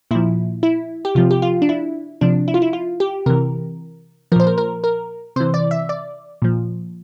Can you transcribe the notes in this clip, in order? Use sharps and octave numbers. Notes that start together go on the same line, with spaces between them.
A#2 F3 E4
E4
G4
C3 F3 F4
G4
F4
D4
E4
C3 F3 D4
E4
F4
E4
F4
G4
C3 E3 A#4
A#2 F3 A#4 C5
A#4
A#4
A#4
C3 E3 C5
D5
E5
D5
A#2 F3